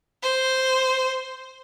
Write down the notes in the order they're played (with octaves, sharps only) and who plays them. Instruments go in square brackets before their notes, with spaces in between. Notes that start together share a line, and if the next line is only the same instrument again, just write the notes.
[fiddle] C5